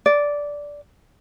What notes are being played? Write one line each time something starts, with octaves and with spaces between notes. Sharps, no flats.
D5